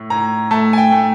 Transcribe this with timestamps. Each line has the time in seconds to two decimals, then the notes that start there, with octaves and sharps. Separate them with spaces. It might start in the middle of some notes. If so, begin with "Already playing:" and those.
Already playing: A2
0.10 A2 A#5
0.51 A3 A5
0.73 G#5
0.78 G5
0.92 A3